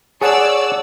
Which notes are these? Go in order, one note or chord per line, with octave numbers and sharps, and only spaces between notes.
G#4 C#5 D5 F#5 A5 C#6 E6